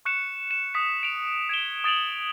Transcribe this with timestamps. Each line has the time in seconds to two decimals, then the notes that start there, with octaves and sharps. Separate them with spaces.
0.05 C#6 F#6 C#7 E7
0.51 E7
0.74 D#6 B6 C#7
1.03 D7 F7
1.49 G#6 D7 E7 G7
1.84 D#6 A6 D7 F7 F#7